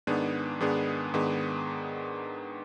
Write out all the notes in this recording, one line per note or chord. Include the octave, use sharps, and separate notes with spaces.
G#2 D#3 B3 D4 G#4
G#2 D#3 B3 D4 G#4
G#2 D#3 B3 D4 G#4